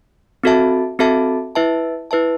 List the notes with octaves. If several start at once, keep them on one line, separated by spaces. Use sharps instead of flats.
C4 F#4 A4 E5 A5
C4 F#4 A4 E5 A5
E4 B4 E5 A5
E4 B4 E5 A5